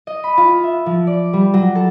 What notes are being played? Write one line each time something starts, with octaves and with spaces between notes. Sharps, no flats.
D#5
B5
F4
E5
F3
D5
G3
F#3
A4